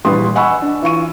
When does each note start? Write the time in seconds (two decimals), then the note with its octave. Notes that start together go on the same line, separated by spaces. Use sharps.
0.05 A#1 E3 G3 B4 C6 D#6
0.35 D#5 F#5 G#5 B5 C#6 E6
0.62 D4
0.82 E3 F4 C#6 D#7